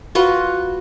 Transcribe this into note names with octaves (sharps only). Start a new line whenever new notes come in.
F4 F#4 B4